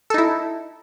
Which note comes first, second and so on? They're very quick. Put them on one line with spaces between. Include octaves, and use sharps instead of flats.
A4 D#4 E4